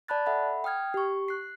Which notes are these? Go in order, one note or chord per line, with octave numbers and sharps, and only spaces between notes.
D5 A5 B5 F#6 A6
A4 E5 F#5 B5
G5 D#6 F6 G#6
G4 C#6
F#6 C7